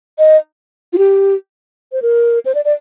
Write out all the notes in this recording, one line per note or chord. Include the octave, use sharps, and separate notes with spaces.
D#5
F4
G4
C5
A#4
C5
D5
D5